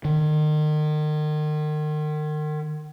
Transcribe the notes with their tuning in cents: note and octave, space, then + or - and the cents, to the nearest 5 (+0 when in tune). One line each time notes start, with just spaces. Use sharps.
D#3 -35